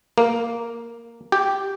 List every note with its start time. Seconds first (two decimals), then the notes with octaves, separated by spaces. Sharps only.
0.18 A#3
1.32 G4